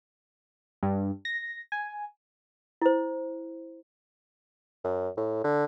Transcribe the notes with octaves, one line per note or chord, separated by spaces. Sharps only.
G2
A#6
G#5
E4 C5
F#2
A2
D3